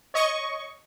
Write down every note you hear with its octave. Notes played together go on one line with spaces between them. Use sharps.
C#5 D#5 C#6